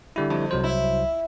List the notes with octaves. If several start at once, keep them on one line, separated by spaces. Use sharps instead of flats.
D3 G3 E4
F2
C2 F#3 C5
E4